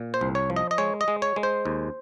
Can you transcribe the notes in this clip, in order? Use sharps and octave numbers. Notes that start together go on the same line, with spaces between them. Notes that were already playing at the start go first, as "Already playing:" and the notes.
Already playing: A#2
C5
C2
C#5
F3
D#5
D#5
G#3 C#5
D#5
G#3
C#5
G#3
C5
D#2